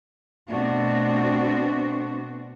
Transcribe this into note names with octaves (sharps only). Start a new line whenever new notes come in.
B2 A3 B3 C4 D4 F#4